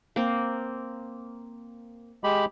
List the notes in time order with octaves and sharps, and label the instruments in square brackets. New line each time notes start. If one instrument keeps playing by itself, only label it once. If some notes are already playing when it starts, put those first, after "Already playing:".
[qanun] A#3 C4
[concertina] G#3 G4 B5